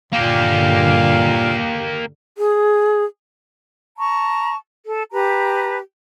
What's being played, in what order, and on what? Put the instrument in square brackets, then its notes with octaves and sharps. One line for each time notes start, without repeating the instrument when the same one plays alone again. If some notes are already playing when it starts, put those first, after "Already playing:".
[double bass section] G2 D3 [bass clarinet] A#2 [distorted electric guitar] A#3 G4 [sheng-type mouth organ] F5
[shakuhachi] G#4
[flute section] A5 A#5 C#6
A4
G4 B4 A5 A#5